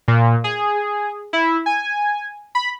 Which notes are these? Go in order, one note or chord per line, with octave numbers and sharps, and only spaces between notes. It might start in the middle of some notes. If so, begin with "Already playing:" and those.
A#2
G#4
E4
G#5
B5